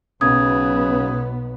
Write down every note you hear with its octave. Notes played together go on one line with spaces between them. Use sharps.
B1 C#3 B3 D#6 G#6